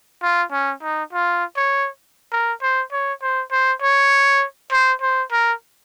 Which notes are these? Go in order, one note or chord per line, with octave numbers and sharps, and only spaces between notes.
F4
C#4
D#4
F4
C#5
A#4
C5
C#5
C5
C5
C#5
C5
C5
A#4